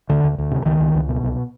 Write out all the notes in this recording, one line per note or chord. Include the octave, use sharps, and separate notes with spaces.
D2 D3
D2
D2
C3
C#2 D#3
C#2
C#2
B2
C2